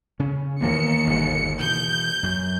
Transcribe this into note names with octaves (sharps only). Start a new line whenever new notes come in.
C#3 C#4
D#2 E3 A#3 B3 C#7
G1 B2
B2 E3 G6
F#2 F#3